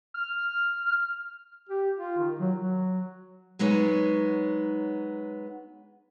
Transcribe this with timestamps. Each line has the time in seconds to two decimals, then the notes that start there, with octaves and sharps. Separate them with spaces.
0.14 F6
1.69 G4
1.96 F4
2.18 D#3
2.39 F#3
2.58 F#3
3.59 F#3 G#3 B3 D#4 C#5